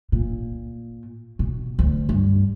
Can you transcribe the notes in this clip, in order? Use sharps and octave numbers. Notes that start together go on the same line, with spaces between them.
A#2
B2
D2
G2